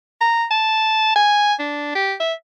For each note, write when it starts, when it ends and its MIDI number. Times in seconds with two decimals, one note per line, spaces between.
0.21 0.45 82
0.51 1.14 81
1.16 1.54 80
1.59 1.95 62
1.95 2.13 67
2.20 2.33 76